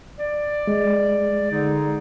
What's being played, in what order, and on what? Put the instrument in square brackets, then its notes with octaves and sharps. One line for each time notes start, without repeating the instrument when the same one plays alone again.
[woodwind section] D5
[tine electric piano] G#3
[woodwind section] D3 D#4 G#4